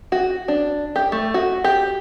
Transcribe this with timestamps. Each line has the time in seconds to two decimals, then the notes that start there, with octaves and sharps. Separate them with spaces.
0.12 F#4
0.48 D4
0.96 G4
1.12 A3
1.34 F#4
1.64 G4